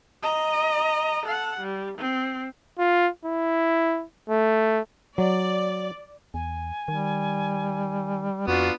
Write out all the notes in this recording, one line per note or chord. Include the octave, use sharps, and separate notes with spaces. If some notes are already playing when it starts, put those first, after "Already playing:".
D#5 A#5
A4 F#5
G3
C4
F4
E4
A3
F#3 D5
E2 G#5
D#3 G3
F2 B3 D4 F4 F#4